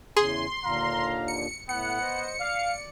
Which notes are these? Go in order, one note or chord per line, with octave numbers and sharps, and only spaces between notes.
E2 C#3 G#4 G#5 C6
D#2 A#2 D3 F5 A#5
C#7
A2 B3 F#5 C#7
C5 D#5
D5 F5